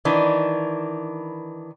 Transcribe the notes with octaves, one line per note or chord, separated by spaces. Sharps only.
D#3 E3 D4